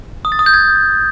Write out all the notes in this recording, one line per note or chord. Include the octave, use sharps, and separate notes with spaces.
D#6
A6
D#6
G6
G#6